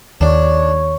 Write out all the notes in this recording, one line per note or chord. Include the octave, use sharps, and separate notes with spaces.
D#2 D4 C#5